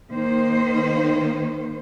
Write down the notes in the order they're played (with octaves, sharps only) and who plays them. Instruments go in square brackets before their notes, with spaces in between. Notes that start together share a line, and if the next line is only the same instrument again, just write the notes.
[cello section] D#3 A#3 C5